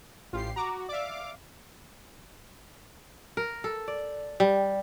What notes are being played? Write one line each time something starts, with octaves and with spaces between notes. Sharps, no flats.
A1 F4 G4 C7
F#4 A#5 D6
D5 E5 F5 D6
A#4
A4
D5
G3